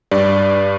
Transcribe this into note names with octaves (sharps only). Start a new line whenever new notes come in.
G2 D5